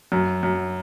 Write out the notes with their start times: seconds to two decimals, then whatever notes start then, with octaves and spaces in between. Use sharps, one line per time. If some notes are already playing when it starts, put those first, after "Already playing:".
0.12 F#2
0.43 F#2